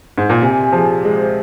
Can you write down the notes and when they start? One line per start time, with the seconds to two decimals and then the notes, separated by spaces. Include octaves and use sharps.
0.18 G#2
0.29 A#2
0.41 C3 G#5
0.72 F3 G#4
1.04 G#3 C5